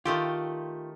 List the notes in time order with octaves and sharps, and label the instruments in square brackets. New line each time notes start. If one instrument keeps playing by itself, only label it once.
[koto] D#3 A3 G4 [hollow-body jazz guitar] F4